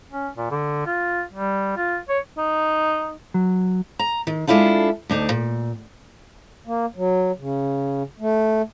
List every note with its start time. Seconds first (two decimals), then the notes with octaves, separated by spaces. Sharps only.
0.11 C#4
0.37 A#2
0.51 D3
0.86 F4
1.33 G3
1.77 F4
2.09 C#5
2.38 D#4
3.34 F#3
3.99 A#5
4.27 D#3
4.47 G#3 A#3 D4 E4 F4 A4
5.09 D2 D4 D#4
5.30 A#2
6.67 A#3
6.96 F#3
7.38 C#3
8.20 A3